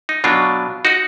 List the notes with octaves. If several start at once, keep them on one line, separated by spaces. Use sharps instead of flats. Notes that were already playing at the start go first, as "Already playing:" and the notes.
D#4
B2 F#3 D4 F4
D#4 F#4